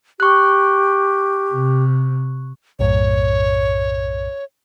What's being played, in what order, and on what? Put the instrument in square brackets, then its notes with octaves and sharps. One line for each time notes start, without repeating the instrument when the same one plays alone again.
[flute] G4 [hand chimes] C#6 F#6
[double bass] C3
[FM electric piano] B1 F#2 A2 [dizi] C#5